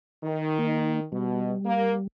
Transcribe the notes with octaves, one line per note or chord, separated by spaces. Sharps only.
D#3
A#3 D#4
B2 G3
A#3